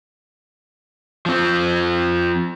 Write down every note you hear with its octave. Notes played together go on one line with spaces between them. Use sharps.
F3 C4